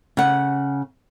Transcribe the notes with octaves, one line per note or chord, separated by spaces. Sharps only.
C#3 F#5